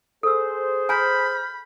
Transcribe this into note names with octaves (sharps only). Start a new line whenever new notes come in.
G#4 A4 C5 E6
G#5 A#5 B5 F6 G6